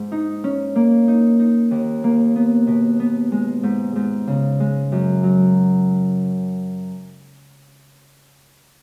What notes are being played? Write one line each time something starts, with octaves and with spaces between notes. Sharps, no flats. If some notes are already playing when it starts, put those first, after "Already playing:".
Already playing: G#2
D#4
C#4
A#3
D#4
D#4
D#2
A#3
B3
B2
B3
G#3
G#2
G#2
C#3
G#3
F#2
F#3